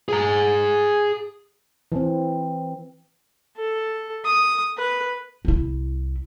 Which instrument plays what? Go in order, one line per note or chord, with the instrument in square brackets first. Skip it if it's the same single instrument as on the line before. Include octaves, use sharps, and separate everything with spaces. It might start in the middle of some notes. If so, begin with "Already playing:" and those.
[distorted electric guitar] G#4 A#5
[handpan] E3 C4
[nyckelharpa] A4
D#6
B4
[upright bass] C2 E4